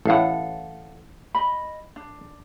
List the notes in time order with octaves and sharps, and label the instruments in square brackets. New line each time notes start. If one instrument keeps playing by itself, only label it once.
[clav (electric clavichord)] A1 A2 [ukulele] A4 F5 F#5
[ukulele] D#5 B5
D4